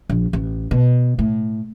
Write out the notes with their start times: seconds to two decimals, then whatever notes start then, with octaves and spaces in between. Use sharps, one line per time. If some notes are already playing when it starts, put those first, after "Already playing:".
0.09 A#1
0.33 A1
0.71 B2
1.19 A2